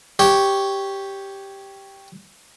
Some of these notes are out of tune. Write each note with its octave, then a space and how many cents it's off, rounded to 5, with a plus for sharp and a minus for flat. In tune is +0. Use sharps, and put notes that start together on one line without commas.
G4 +0 C#5 +0